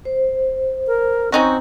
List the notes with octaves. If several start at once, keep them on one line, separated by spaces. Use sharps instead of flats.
C5
A#4
C4 C#4 D#4 F#4 A#5